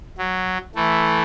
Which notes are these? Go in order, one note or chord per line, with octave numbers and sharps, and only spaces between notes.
F#3
E3 A3